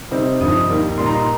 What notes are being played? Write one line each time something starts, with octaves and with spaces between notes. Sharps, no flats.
C3 G3 C4 D#4
G2 F3 D#4 D#6
D#2 D#3 G3 A#3
A#2 G3 D#4 C6
A#5
C6